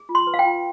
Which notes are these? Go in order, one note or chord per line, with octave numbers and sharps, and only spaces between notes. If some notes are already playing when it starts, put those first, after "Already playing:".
Already playing: G#4
F4
C6
B4
F5
G5
F4